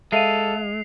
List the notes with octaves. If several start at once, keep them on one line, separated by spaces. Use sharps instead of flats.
G#3 A4 E5 F5 C7 D#7 F7